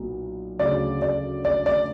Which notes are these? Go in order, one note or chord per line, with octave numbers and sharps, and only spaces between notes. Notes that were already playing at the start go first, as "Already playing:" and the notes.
Already playing: B1 A#2 B3
D2 C#3 F#3 D5
D5
D5
D5